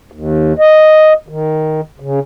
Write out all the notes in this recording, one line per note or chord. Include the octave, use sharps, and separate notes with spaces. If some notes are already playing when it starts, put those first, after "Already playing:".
D#2
D#5
D#3
C#3